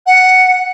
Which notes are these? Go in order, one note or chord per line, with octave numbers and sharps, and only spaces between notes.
F#5